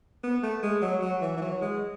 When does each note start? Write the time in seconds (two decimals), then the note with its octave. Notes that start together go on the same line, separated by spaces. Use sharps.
0.23 B3
0.43 A3
0.63 G#3
0.82 F#3
1.02 F#3
1.22 E3
1.37 E3
1.42 F#3
1.61 G#3